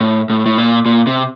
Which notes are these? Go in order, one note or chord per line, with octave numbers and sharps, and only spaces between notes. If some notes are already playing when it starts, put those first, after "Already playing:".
A2
A2
A2
A#2
A#2
C3